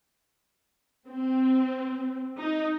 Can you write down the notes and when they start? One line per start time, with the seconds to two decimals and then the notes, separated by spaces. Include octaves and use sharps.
1.08 C4
2.38 D#4